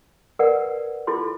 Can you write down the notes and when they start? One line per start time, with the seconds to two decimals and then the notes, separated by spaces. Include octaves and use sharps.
0.39 A#4 B4 D5 F#5
1.07 E4 F4 A4 C6